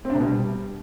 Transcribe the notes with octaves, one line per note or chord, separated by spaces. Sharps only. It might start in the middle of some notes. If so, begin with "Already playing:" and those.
C4
D4
C3
B2
G3